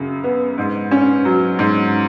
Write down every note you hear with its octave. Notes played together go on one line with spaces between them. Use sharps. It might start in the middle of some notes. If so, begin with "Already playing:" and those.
Already playing: F#2 C#3
B3
G#2
C#4
F#3
G#2